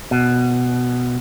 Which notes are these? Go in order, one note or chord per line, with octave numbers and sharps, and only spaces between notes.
B2